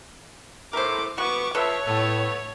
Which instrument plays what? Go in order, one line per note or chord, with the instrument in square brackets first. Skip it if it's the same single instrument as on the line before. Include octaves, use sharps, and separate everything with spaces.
[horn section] A2 [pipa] A#4 C5 [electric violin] D6
[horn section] E3 B3 [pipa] F#4 [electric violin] C#6 D6
[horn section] F3 E5 [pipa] A4 B4 [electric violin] C#5
[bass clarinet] A2 [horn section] A3 B3